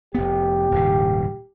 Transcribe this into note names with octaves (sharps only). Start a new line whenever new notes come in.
F1 B3 G4
D#1 G#2 C#3